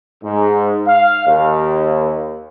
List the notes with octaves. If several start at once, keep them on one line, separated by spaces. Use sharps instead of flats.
G#2
F5
D#2